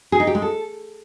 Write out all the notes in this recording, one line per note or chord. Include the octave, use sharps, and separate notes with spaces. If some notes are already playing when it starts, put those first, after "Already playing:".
G#4
D#4
G4
G#3
A4